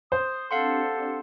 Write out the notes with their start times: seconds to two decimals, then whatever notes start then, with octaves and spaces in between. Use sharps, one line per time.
0.12 C5 D#6
0.51 C4 D4 G4 A4 F5 F#5 C6